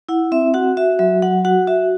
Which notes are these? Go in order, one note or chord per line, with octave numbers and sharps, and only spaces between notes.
E4 F#5
C4 E5
F#4 F#5
F#4 E5
F#3 E5
F#3 F#5
F#4 F#5
F#4 E5